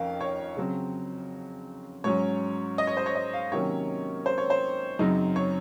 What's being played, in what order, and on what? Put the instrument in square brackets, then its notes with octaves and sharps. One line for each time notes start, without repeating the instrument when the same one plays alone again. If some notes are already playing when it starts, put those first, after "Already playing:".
Already playing: [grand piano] F2 D#3 C#4 F5
C#5
C#3 F#3 C4
G#2 F#3 C#4 C#5
D#5
C#5
C5
C#5
D#5
F5
C3 D#3 F#3 A#3 C#4 C#5
C5
C#5
C5
F#2 C#3 F#3 C4 D#4
C#5